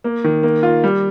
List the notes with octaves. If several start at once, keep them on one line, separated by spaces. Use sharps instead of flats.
A#3
D#3
A#3
F4
G3